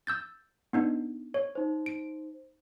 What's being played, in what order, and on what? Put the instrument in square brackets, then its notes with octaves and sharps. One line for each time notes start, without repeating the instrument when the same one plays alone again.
[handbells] E6 G6 A6
B3 D4 D#4
C#5
[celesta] D#4 C5
[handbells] D7